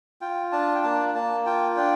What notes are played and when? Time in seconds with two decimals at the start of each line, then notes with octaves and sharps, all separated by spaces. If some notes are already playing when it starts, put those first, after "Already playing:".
0.21 F4 G5
0.52 D4 A5
0.75 G5
0.84 A#3 A5
1.15 A#3 A5
1.46 F4 G5
1.76 D4 G5